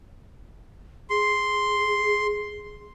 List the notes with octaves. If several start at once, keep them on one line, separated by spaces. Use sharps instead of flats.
G#4 C6